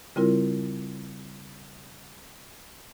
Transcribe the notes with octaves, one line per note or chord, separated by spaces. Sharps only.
C#3 G3 C4 E4 F4 A#4